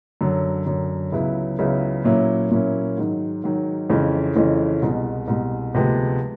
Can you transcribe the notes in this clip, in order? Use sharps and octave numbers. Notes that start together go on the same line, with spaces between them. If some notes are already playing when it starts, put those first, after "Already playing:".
F#2 D3 F#3
F#2 D3 F#3
C#2 C#3 F#3 B3 E4
C#2 C#3 F#3 B3 E4
A#2 F#3 A#3 C#4 E4
A#2 F#3 A#3 C#4 E4
G#2 D#3 F#3
G#2 D#3 F#3
F2 C#3 E3 G#3 C#4
F2 C#3 E3 G#3 C#4
C2 B2 G#3
C2 B2 G#3
D2 C3 F3 G#3 B3